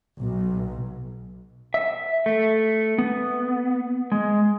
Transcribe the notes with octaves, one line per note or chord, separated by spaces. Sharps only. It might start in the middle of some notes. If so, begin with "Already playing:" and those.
B1
E5
A3
B3
G#3